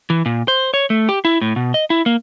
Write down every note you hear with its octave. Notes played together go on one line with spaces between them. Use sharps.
E3
A#2
C5
C#5
A3
G4
E4
A2
B2
D#5
E4
A#3